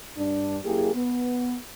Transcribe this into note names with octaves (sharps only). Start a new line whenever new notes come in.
G2 D4
F#2 A#3 E4 G4 G#4
B3